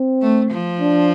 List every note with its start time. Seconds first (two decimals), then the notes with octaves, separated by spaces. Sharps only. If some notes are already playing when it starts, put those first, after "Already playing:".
Already playing: C4
0.21 A3
0.51 F3
0.81 D4